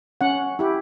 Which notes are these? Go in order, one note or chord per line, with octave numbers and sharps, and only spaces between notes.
C#4 F#5
E4 G4